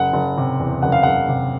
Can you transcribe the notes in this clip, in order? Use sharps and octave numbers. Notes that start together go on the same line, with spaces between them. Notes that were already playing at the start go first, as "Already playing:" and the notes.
Already playing: F#1 F#5
F#1
C3
E2
F#1 F#5
F5
F#1 F#5
C3